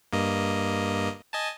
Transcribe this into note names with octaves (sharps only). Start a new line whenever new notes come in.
G2 A#3 D#5
D#5 G#5 A5